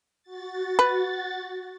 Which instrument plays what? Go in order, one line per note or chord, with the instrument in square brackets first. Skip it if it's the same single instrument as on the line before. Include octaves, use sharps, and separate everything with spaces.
[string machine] F#4 A6
[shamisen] B4